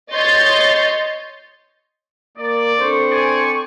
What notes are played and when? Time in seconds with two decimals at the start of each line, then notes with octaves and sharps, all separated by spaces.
0.13 C#5 D#5 C6 G6 A6
2.37 A#3 D5
2.79 C4 D4 A4 C5 C#6
3.11 D5 G#5